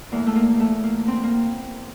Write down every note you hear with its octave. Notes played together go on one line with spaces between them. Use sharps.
E2 E3 A3 A#3
A3
A#3
A3
A#3
C4
A#3